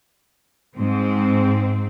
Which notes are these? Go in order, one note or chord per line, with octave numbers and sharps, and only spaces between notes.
G#2 C4